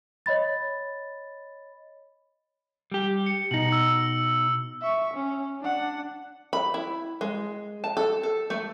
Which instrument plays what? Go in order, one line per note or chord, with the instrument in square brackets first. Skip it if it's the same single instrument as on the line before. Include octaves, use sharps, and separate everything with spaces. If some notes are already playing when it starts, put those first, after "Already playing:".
[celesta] C#5 D#5 B5 A6
[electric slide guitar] G3 G4
[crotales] C#7
[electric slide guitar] B2 D#4 [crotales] F#7
[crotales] E6
[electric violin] E5 C#6
C#4
D4 F#5
[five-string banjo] B5
E4
G#3
A5
A4
A4
A3